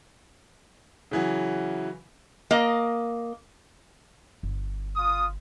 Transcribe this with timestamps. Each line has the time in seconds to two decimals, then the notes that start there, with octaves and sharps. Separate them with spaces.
1.11 C#3 E3 F#3
2.51 A#3 D#5
4.43 G1
4.96 F4 D#6